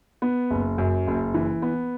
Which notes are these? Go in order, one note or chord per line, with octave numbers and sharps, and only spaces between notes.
B3
F#1
F#2
F#1
E3
B3